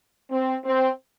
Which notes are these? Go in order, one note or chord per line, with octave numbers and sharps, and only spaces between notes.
C4
C4